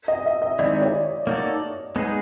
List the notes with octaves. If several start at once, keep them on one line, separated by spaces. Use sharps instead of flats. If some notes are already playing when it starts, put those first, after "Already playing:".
D#5
E5
D#5
D#3 G#3 C4 E4 D5
C#5
A#3 D#4 F#4 A4 D5
G#3 B3 D#4 G#4